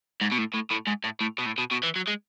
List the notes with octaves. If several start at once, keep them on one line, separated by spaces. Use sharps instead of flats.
G#2
B2
A2
A2
A2
G#2
A2
A2
B2
A2
B2
B2
E3
F#3
G#3